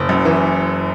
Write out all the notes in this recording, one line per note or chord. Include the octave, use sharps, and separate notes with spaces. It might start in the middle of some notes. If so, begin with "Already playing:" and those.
Already playing: F#1
F#2
E3